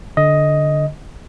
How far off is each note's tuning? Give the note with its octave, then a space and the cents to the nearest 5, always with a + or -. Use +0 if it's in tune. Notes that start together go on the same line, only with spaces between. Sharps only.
D3 +0 D#5 +10